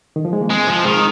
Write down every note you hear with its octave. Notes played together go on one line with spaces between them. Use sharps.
D#3
F3
G#3
A#3
G#3 C4
F3
D#3 G#3